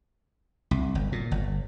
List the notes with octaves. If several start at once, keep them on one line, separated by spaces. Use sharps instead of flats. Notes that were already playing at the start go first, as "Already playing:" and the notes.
C2
G1
A#2
G1